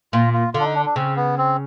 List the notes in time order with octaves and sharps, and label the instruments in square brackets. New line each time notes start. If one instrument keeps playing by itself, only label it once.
[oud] A#2 [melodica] F4
[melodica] F4
[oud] D3 [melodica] F4
[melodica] D4
D#4
D4
D4
[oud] C#3 [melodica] C4
[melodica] B3
C4